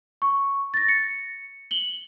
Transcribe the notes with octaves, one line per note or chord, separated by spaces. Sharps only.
C#6
A6 A#6
C#7
F#7 G7